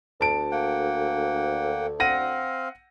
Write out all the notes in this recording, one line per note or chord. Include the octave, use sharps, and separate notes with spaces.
D2 A5 D7
A#3 F#5 G5
C4 F5 F#5 A#6 D#7